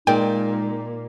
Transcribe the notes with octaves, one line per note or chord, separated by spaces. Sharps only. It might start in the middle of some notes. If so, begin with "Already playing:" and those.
A#2 G#3 D#4 G5